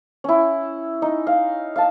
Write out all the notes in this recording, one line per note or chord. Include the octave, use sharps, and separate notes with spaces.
C#4 E4
D#4
F5
F5 A5